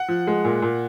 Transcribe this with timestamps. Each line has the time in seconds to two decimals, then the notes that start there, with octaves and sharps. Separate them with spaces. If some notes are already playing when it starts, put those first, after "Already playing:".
Already playing: F#5
0.08 F3
0.27 G#3
0.44 A#2
0.62 A#2